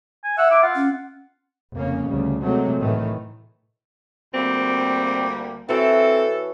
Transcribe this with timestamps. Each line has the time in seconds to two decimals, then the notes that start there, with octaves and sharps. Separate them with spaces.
0.24 G#5
0.38 E5 F#5 E6
0.51 E4 D6
0.63 F4 F#5
0.76 C#4
1.74 F1 C#3 A#3 C#4
2.08 D2 C#3 G3
2.42 C3 F#3 G#3 A3
2.80 A2 D#3 E3 A3
4.34 D2 G3 A#3 C4
5.69 E3 C4 F#4 A4 C#5